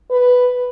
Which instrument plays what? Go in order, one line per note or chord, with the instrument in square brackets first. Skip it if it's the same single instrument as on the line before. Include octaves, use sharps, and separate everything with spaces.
[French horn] B4